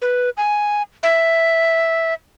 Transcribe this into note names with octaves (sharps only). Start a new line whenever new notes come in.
B4
G#5
E5